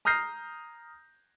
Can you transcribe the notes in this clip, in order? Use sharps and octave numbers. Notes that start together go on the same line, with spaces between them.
A#5 D#6 F6 G6 A#6 C7